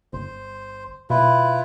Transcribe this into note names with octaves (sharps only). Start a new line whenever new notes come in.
G1 C5
B2 E4 F4 B4